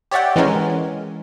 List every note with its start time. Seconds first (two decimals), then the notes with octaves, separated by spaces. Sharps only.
0.11 G4 C#5 D5 E5 F#5 G5
0.36 E3 G#3 C#4 A#4 C#5